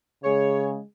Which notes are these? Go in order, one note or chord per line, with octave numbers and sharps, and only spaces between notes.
C#3 G#3 G#4 C#5